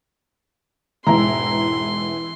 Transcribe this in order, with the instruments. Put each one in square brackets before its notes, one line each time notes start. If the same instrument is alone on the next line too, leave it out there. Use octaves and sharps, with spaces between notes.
[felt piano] E1 G#2 [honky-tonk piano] E3 E4 [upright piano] A#5 [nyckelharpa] C6